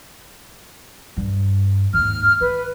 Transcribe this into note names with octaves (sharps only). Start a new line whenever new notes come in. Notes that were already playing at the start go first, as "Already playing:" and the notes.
G2
D#2 G#2 F6
D#3 B4